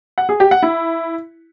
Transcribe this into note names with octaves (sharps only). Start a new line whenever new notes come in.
F#5
G#4
G4
F#5
E4